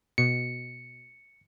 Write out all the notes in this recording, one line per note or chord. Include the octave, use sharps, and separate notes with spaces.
B2 C#7